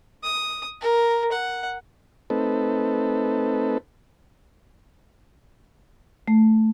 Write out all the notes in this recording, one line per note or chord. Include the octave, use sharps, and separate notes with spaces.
D#6
A#4
F#5
A3 C4 D#4 A4 B4
A3